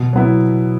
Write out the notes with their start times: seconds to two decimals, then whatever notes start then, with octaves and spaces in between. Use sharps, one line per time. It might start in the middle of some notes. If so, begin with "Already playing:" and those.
Already playing: B2
0.13 F#3 B3 E4